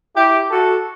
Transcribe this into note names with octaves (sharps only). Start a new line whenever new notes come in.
E4 G4
F#4 A4